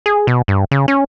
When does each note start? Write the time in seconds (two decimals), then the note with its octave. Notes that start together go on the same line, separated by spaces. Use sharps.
0.06 G#4
0.27 B2
0.48 G2
0.71 C#3
0.88 C#4